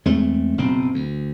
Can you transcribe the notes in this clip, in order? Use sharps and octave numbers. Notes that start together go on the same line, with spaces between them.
E2 G#3 A3 C4
F#1 B2 C4
D2